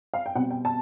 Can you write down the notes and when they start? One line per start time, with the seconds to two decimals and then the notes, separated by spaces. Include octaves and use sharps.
0.14 F5
0.26 G5
0.35 B2 G3 C4 F#5
0.51 G5
0.65 A5